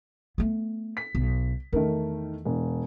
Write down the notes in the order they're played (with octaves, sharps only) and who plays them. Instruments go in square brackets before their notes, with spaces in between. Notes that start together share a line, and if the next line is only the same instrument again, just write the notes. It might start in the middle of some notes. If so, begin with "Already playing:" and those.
[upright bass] A3 B3
[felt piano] B6
[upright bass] B1
[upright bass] E2 [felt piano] D#3 A3 A#4
[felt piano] E1